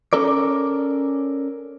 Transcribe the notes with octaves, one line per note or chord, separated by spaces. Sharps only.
C#4 A4 A#4 D5